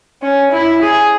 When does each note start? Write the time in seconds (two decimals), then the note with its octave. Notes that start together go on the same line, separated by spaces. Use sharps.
0.22 C#4
0.52 E4
0.82 G#4